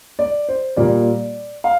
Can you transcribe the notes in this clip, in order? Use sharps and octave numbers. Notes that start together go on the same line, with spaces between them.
D5
C5
A#2 G3 A#3 D5
F5